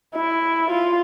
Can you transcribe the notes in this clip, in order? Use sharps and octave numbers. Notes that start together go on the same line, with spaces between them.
E4
F4